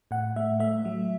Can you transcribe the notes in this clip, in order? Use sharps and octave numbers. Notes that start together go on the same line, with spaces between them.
A2 F#5
A3 E5
A3 E5
F#3